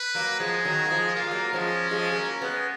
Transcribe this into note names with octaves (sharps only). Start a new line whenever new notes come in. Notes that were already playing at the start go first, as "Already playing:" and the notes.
Already playing: B4
F#3 A#3
F3 G#3 G#4
D#3 F#3
A#3
F3 G#3
A#3 F4
G#3
F#3 A#3
F3 G#3 C#4
F3 G#3
G#3
F#3 A#3
G#3 B3